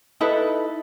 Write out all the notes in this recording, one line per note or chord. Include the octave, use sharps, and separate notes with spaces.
D#4 E4 A4 B4